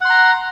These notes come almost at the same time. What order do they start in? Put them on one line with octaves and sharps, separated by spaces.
F#5 C6 A#5